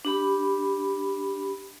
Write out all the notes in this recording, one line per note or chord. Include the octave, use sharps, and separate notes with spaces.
D4 G4 B5